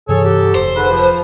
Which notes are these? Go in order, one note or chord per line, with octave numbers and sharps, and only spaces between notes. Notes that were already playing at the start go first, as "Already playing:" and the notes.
G2 C3 E3 G#4 A4 C#5
F#3 G4
F1 C5
G#2 D3 B4
F3